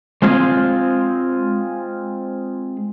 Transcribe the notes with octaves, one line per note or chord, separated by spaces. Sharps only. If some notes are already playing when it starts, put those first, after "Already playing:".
G#3 C4 F4 G#4